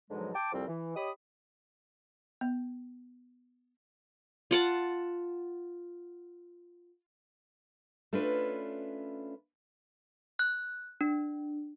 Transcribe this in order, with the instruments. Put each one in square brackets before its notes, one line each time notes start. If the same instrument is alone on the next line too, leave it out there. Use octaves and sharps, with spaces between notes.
[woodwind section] G#2 B2 D3 F3 F#3 G#3
G5 A5 D6
C2 F2 F3 G3 C4
E3
G4 C#5 D#5 B5 D#6
[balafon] B3
[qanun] F4 F#5 A5
[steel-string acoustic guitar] A3 C#4 D4 F4 B4
[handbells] F#6
D4